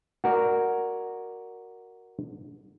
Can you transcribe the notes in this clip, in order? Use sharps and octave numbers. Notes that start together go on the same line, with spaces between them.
F#4 A#4 D5